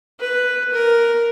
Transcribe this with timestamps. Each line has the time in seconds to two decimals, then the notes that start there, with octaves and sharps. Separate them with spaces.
0.20 B4
0.73 A#4